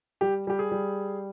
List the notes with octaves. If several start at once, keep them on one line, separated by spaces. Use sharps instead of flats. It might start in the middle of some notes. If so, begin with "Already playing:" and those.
G3 G4
G3 G4
G#4
G3